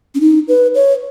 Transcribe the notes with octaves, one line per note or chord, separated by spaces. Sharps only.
C#4
D#4
B4
C#5